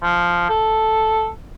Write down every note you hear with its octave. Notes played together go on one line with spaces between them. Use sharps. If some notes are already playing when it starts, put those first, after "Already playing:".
F3
A4